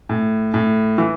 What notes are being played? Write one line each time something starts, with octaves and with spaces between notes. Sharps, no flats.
A2
A2
E3